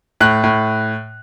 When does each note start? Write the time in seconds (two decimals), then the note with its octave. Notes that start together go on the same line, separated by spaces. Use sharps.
0.20 A2 F#6
0.44 A2